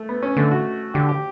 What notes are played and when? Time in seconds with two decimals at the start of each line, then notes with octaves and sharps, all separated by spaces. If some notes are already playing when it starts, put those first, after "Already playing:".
Already playing: A3
0.09 B3
0.22 C#4
0.37 D3 A3
0.51 F#4
0.94 D3 G4
1.09 G4